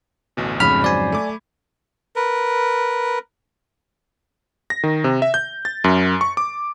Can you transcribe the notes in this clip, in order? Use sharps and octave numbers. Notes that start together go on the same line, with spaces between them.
A1 D2 B2
F2 G#2 C#3 B5 F6
F#3 C5 D5 G#5
A3 D6 G#6
A#4 B4
A#6
D#3
C3
E5
G6
A6
F#2
C#6
D6